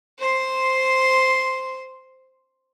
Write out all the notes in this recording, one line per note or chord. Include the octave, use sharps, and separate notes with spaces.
C5 C6